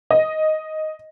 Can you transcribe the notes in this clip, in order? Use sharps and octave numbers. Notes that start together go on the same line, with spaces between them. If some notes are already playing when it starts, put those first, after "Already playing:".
D#5